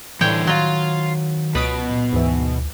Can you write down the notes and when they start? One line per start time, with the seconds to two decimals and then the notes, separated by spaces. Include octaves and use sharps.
0.21 A2 D3 E3 G3 C5 C#5 G5
0.47 D#3 F#3 F4 F5 C6
1.55 C#2 B2 B4 D#6 D7
1.91 A#2
2.13 D2 G#2 E3